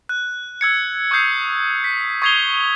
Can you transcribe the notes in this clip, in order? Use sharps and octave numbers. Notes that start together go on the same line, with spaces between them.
F#6
E6 G#6 C#7
C#6 D#6 E6 G6 C7
B6
C#6 D#6 G#6 C7 F7 G7